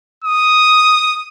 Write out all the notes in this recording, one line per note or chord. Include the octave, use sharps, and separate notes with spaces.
D#6